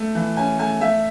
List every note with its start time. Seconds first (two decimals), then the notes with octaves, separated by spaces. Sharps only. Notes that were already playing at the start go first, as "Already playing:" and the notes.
Already playing: A3
0.15 E3
0.37 C#4 G#5
0.59 A3 G#5
0.81 A3 E5